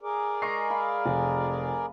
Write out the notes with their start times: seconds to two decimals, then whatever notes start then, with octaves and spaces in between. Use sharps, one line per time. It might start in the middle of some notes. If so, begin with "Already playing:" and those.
0.01 G#4 A#4 D5
0.42 G#3 D#5 A#5 C#6 C7
0.70 F5 B5
1.06 F1